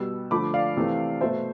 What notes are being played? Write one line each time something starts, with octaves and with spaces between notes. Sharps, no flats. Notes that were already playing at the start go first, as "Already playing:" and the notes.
Already playing: B2 G3 E6
D3 F3 A3 B5 D6
D5 F5
C3 E3 A3
B2 A3 C5 E5